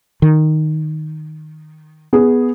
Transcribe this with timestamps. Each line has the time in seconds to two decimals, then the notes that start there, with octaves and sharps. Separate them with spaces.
0.22 D#3
2.13 B3 G#4